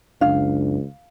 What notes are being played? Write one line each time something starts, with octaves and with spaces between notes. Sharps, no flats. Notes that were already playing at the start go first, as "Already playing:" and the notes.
F#1 C#2 D4 F5